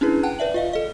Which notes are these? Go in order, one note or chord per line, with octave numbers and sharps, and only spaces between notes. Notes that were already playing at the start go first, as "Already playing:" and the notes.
C#4 D4 E4 G#4 B4
F#5 G5 A5 F#6
B4 D5 E5 F#7
F4 D#5 F5
A4 D#5